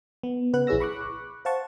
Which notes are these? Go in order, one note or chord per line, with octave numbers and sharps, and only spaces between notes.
B3
C#3 B4 F#5 F#6
A#1 E4 G#4 C#5 E6 A#6
B5 C#6 D6 F#6
C5 F5 F#5 A5 C#6